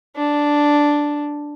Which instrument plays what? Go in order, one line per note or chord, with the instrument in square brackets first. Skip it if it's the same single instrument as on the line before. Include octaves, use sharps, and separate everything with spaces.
[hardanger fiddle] D4